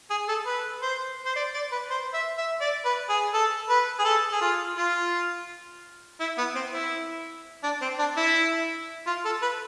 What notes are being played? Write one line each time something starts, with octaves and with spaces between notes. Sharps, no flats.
G#4
A4
B4
C5
C5
D5
D5
B4
C5
E5
E5
D5
B4
G#4
A4
B4
G#4
A4
G#4
F4
F4
E4
B3
C4
E4
D4
C4
D4
E4
F4
A4
B4